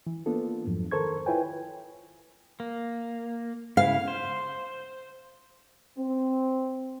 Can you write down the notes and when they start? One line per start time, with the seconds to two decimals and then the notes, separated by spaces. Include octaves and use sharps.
0.07 E3
0.26 A#3 B3 D4 F4 A4
0.65 F2 G#2 F3 F#3
0.91 D#3 A4 A#4 C5 C#6 G#6
1.26 E4 F4 B4 C#5 G5 G#5
2.60 A#3
3.77 C#3 E4 F5
4.08 C5
5.99 C4